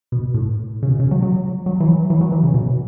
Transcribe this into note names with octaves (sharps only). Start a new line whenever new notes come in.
B2
A2
C#3
B2
C#3
F#3
F#3
F#3
E3
F#3
E3
F#3
E3
C#3
B2